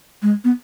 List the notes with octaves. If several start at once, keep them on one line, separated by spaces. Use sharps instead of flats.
G#3
B3